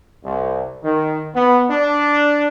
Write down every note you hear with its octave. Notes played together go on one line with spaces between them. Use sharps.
C2
D#3
B3
D4